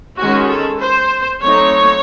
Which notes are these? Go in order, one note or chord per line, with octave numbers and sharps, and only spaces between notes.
D#3 G#3 C#4 F#4
A4
C5
F#3 A3 C4 D#4 C#5